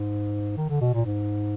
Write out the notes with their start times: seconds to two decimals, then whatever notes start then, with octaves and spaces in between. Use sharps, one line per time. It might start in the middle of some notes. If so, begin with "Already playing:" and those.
Already playing: G#2
0.57 D#3
0.69 D3
0.81 B2
0.94 A#2
1.06 G#2